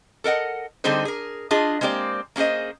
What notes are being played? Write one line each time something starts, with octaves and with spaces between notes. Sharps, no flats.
A4 A#4 D#5 F#5
D3 G3 C4 D#4 G#4 C5
G#4 A#4
D4 F4 G#4 D#5
G#3 A#3 C4 G4 D5
A#3 C#4 G#4 C5 D#5